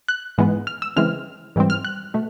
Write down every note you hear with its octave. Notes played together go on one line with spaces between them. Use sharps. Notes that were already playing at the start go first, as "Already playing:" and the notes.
F#6
G#2 E3 G#3 B3
F6
E6
C#3 E3 G#3 C4 F6
G#2 E3 G3 C4
F6
F#6
B2 A3